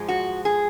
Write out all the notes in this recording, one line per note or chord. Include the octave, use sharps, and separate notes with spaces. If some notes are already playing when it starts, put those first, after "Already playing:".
Already playing: G#2 F3 G#3
F#4
G#4